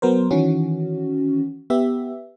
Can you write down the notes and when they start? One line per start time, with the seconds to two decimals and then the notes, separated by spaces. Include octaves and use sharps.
0.02 F#3 B3 A#4 C5
0.31 D#3 E3 C#4 F#4
1.70 B3 G4 E5